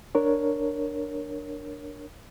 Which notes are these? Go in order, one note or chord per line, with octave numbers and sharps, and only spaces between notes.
D4 A#4 C#5